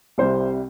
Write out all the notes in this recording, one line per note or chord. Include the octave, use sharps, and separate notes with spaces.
C2 C3 G3 C5